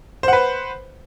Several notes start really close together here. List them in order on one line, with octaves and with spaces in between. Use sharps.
C5 F#5 B4